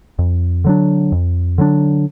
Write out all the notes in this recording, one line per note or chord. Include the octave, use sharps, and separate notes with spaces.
F2
D3 F#3 D4
F2
D3 F#3 D4